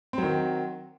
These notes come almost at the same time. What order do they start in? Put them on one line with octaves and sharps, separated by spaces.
C4 F#3 D#3